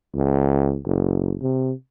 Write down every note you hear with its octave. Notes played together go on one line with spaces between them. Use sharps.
C#2
F#1
C3